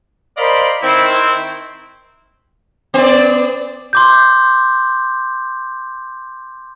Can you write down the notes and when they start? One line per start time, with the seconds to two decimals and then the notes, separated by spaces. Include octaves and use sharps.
0.37 A#4 C5 D5 D#5 F5 B5
0.82 D#3 C4 E4
2.94 B3 D5
3.93 C6 D6 G6